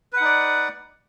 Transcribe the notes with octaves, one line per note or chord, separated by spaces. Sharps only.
D#4 B4 D5 F#5